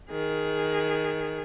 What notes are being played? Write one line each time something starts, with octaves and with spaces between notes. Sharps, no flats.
D#3 G#4